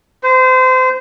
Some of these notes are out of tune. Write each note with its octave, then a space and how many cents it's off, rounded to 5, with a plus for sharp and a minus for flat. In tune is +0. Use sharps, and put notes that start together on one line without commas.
C5 -30